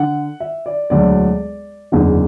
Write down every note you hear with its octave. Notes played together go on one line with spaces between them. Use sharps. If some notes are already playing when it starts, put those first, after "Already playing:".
Already playing: D3 F#5
E5
D5
E1 D2 D3 F#3 D5
F#1 E2 D3